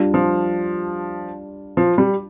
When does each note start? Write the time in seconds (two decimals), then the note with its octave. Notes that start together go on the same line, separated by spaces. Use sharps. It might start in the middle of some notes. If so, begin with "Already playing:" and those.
Already playing: G3 D4 F4
0.14 F3
1.77 F3
1.98 G3